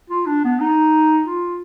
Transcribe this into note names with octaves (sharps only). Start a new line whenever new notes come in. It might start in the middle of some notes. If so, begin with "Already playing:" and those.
F4
D4
B3
D#4
F4